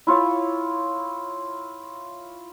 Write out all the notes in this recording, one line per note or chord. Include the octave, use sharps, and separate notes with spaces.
E4 F4 C#5